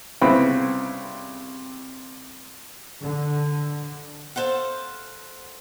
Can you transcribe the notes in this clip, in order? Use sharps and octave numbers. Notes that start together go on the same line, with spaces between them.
C2 C#3 B3 C4 E4 B5
D3
A4 C5 F5 F#5